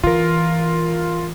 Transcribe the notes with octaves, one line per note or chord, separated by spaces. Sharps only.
E3 F4 A#4